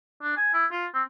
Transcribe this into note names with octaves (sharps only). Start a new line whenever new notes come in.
D4
G#5
E4
F4
C4